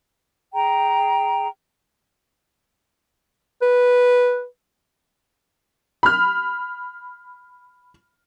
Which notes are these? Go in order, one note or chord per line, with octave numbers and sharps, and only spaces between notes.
G#4 G5 A#5
B4
B5 F6